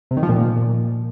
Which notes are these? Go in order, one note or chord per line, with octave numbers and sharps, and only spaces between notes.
C3
D#3
F3
A#2